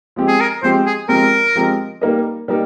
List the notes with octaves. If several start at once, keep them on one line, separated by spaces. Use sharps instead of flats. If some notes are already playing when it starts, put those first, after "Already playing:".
F3 G#3 C4 G4
G#4
A#4
F3 G#3 C4 G4 C5
G#4
F3 G#3 C4 G4 A#4
F3 G#3 C4 G4
G3 A#3 D#4 A#4 D#5
G3 A#3 D#4 A#4